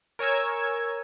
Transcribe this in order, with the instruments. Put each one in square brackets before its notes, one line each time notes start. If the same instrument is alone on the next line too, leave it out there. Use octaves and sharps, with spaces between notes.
[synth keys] A#4 C#5 G#5 E6 G#6